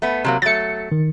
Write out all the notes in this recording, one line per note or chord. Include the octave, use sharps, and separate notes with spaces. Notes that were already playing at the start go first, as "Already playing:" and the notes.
A3 B3
C3 F#3 A#3
F#3 A3 A6 C#7
D#3